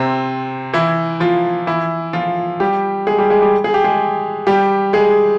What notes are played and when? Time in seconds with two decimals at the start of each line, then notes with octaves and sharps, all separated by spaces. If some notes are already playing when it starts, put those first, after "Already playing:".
Already playing: C3 C4
0.73 E3 E4
1.20 F3 F4
1.67 E3 E4
2.13 F3 F4
2.60 G3 G4
3.07 G#3 G#4
3.18 G3 G4
3.30 G#3 G#4
3.42 G3 G4
3.64 G#4
3.74 G4
3.84 G#3 G#4
4.47 G3 G4
4.93 G#3 G#4